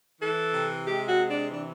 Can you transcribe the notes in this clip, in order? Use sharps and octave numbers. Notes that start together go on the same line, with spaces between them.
E3 A4
C3
G#3 G4
F#4
C3
D4
E3 D4